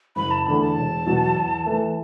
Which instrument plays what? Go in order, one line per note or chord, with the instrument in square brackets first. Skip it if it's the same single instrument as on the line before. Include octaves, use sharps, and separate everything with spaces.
[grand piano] F#1 [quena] B5
[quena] A5
[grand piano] E2 D3 A3 [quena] B5
[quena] A5
[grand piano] E1
E2 B2 F#3
E2
E3 A3